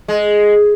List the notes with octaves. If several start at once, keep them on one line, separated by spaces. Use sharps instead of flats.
G#3